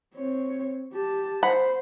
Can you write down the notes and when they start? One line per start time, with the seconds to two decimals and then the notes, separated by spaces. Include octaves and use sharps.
0.15 C4 C#5
0.93 G4 A5
1.43 C5 F#5 B5